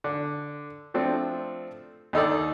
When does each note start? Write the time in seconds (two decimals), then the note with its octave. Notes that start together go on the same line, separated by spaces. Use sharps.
0.04 D3
0.94 F3 A3 C4 D4
2.13 D#2 D#4 A4 D5